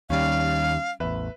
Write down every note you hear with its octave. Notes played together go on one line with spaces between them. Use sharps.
D#2 D#3 G3 C#4 F5
A1 E2 B4 E5